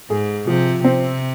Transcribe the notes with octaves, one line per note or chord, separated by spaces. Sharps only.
G#2 G#4
C3 F3
C3 C4